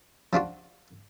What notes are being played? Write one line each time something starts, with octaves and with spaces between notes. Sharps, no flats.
F3 D4 F4 F#4